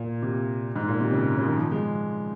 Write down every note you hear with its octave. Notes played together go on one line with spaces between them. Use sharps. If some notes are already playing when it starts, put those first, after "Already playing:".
Already playing: A#2
C3
G#2
A#2
C3
C#3
C#3
D#3
F3
G#3